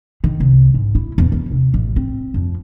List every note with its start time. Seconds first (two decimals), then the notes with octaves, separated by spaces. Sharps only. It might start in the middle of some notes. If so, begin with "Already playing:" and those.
0.24 D#3
0.40 C2
0.74 G#2
0.95 E4
1.18 E2
1.32 E2
1.51 C3
1.74 A1
1.96 C4
2.34 F2